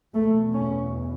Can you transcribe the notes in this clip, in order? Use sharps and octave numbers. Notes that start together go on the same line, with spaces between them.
E2 B2 A3
C#4